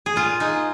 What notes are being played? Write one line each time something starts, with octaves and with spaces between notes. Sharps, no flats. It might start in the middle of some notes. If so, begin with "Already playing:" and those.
G#4
A#2 F4
G#3 D#4